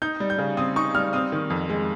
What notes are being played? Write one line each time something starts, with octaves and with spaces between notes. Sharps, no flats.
D#4 G6
G3
G6
C#3
C4 D#6
D#4 C#6
G3 F6
C4 D#6
D#3
F2
G#3